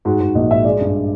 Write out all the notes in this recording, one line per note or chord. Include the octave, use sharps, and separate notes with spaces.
G#2 F#4
G#2
A#1 D#5
G#2 E5
G#3 D5
G2